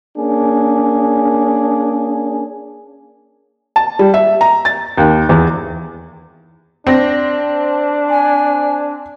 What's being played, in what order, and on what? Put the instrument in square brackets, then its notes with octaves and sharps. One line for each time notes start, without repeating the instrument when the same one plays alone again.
[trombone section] A#3 C#4 D4 G#4
[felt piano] A5
G3
E5
A#5
A6
D#2
E2
[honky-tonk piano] C4 A#6 [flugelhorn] D4
[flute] G#5